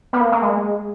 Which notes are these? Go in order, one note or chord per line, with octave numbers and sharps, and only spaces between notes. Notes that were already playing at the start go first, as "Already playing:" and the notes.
B3
A#3
A#3
G#3